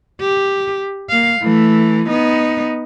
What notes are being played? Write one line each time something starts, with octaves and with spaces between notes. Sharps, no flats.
G4
A#3 F5
E3 A3
B3 D#4